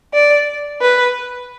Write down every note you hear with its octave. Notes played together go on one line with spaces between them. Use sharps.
D5
B4